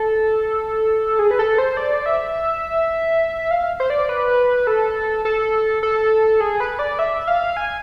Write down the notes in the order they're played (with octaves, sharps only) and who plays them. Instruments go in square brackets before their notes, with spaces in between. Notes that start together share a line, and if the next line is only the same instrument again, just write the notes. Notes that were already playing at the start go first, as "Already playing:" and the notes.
Already playing: [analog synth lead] A4
G#4
B4
A4
C5
D5
E5
F5
C5
D5
B4
A4
A4
A4
G#4
B4
D5
E5
F5
G#5